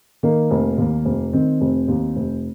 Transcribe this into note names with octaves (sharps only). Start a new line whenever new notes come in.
D#3 A#3
F1
D#2
F1
D#3 C4
F1
D#2
F1